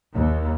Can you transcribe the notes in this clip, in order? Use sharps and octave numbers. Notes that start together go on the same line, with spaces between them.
D#2